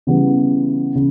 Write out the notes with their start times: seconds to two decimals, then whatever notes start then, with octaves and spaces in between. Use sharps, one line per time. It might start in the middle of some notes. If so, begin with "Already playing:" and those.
0.07 C#3 E3 G3 B3
0.95 C#3